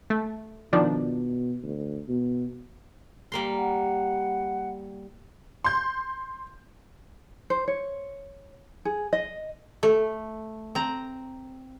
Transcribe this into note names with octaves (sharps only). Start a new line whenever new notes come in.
A3
B2 D#3 F3 D4
D2
B2
G3 A#3 C6
F#5
C6 G6
C5
C#5
G#4
D#5
A3
C4 A#5